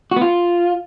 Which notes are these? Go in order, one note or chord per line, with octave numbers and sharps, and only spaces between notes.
F#4
B3
F4